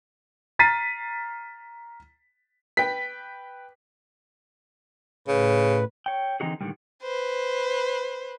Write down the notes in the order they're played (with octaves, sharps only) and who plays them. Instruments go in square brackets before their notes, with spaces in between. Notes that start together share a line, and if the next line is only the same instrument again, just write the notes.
[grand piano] A#5 F6 A6 B6 C7 D#7
[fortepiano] B4 G5 [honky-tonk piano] B6
[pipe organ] A2 B4 [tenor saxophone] C#3
[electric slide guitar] C#5 G5
D3 E3 C4 D#4 F#4 G#4
A2 D3 D#3 G3
[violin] B4 C5